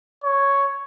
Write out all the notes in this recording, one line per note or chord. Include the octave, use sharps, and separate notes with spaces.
C#5